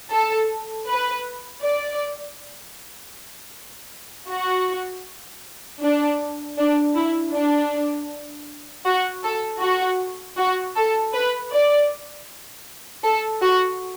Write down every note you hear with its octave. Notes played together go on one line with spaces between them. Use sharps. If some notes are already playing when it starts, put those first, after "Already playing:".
A4
B4
D5
F#4
D4
D4
E4
D4
F#4
A4
F#4
F#4
A4
B4
D5
A4
F#4